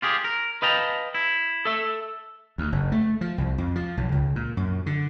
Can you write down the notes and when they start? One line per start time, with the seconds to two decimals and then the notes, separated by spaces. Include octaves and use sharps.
0.02 F4 G4 G#4
0.24 A#4
0.62 B4 D#5 F5 G5 A5 A#5
1.15 E4
1.65 A4 E5
2.58 D2
2.72 F#1
2.92 A3
3.21 F3
3.38 C2
3.58 F2
3.75 F3
3.97 B1
4.12 C#2
4.36 A#2
4.57 F#2
4.86 D3